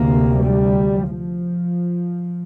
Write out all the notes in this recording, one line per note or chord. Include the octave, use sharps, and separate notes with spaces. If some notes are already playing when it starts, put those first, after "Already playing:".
Already playing: D2 C3 A#3
G3
F3